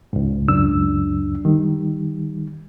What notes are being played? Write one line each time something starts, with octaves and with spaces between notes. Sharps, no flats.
C#2 G#2
C#2 F#2 F#3 D4 E6
D#3 G3